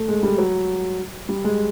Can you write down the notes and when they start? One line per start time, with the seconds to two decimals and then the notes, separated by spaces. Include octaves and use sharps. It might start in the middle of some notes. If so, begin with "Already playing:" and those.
Already playing: A3
0.08 G#3
0.23 G3
0.38 F#3
1.29 G3
1.44 G#3